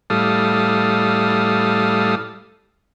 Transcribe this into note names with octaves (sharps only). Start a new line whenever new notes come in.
A2 G3 A4 F5 D#6